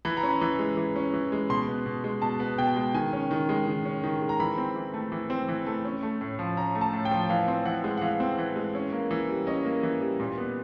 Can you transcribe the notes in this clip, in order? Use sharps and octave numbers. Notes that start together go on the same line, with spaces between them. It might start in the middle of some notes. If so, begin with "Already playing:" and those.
E3 B5
A#5
C#4
B5
E3
G#3
E3
C#4
E3
G#3
B2 C6
B3
B2
G#3
B2 A5
B3
B2 G5
G#3
D#3 G#5
C#4
D#3
G#3
D#3
C#4
D#3
G#3
A#5
E3 B5
C4
E3
A3
E3
C4
E3
A3
C#4
A3
A2
F3
C#4 A#5
A3
A5
A2
G5
F3
E3 F5
C4
E3 F#5
G#3
F#5
E3 F5
C4
E3
G#3
C#4
A#3
E3
G3
C#4 D#5
A#3
E3
G3
A#2
B3